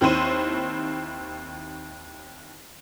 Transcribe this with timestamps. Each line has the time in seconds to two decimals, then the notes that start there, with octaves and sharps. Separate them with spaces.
0.01 D#2 D#3 C4 E4 C5 D#7